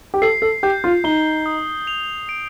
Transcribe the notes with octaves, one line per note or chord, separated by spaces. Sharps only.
G4
A4 C7
A4
G4 G6
F4
D#4 G7
D#6
F7
D7